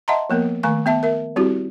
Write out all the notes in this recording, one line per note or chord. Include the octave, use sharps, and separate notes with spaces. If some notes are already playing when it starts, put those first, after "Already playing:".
D#5 E5 F#5 A5 A#5 C6
F3 A#3 B3 A#4
D#3 A3 G#5 C#6
B3 E5 A5
A#4 E5
G3 C4 E4 F#4 G4